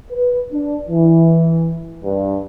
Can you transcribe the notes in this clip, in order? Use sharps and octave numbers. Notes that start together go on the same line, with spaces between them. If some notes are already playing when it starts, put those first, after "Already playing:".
B4
D4
E3
G2